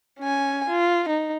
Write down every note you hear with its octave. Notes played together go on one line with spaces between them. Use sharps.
C#4 G#5
F4
D#4